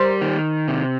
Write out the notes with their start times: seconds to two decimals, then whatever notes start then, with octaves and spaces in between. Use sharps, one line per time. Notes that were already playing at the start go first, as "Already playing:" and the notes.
Already playing: G3 A#4 C5
0.21 D#3
0.68 C3